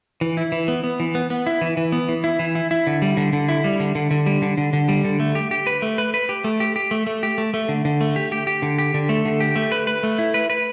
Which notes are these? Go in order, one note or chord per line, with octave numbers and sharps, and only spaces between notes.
E3
E4
E3
B3
B3
E3
B3
B3
E4
E3
E3
B3
E3
E4
E3
E4
E4
D3
G3
D3
D3
E4
G3
D3
D3
D3
G3
D3
D3
D3
G3
D3
A3
G4
G4
B4
A3
B4
B4
G4
A3
G4
G4
A3
A3
G4
A3
A3
D3
D3
A3
G4
G4
G4
D3
G4
D3
A3
D3
G4
A3
B4
B4
A3
E4
B4
B4